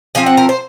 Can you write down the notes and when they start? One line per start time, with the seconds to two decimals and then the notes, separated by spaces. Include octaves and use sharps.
0.15 F3 C4 G#5
0.26 F#5
0.37 A#4
0.49 C5